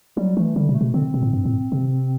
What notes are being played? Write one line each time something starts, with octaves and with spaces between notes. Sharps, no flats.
F#3 G3
E3 A3
D3 G3
B2
A3
B2
D3 C4
B2
A2
G2
A2
C3